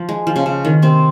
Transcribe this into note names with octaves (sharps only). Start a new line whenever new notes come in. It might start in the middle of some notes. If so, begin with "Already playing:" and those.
Already playing: F3
G#3
F3
C#3
C#3
D#3
C3 C4